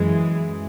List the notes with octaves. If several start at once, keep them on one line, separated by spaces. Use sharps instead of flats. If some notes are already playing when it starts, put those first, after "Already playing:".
Already playing: F#2 E3 G#3